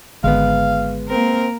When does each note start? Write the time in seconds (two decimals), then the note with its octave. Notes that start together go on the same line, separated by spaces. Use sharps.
0.24 G#1 D3 G#3 B3 F5
1.09 A#3 C4 A#4